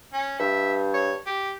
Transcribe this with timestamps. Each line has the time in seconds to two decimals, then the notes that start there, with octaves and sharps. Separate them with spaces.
0.13 C#4
0.39 G2 E5
0.94 C#5
1.27 G4